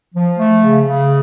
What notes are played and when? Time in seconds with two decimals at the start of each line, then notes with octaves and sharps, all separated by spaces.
0.15 F3
0.38 A3
0.63 C#3
0.86 C#3